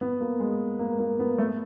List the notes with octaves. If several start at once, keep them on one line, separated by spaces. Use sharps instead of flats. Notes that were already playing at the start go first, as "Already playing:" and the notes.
B3
A#3
G#3
A#3
A#3
B3
A3